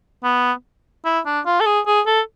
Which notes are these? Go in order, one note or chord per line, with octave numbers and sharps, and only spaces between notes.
B3
E4
D4
F4
A4
G#4
G#4
A4